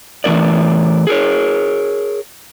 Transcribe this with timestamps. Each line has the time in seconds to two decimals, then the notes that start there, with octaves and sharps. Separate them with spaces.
0.24 E3 A3 B3 A#4 D5
1.07 G#4 A#4 C#5